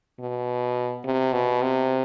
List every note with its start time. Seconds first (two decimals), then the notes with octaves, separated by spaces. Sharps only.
0.20 B2
1.05 C3
1.33 B2
1.62 C3